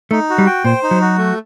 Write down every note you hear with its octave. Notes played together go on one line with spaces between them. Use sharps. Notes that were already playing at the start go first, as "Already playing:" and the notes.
A3 D#4
F#4
G3
G5
A#2 C5
D#4
F#3
F#4
A3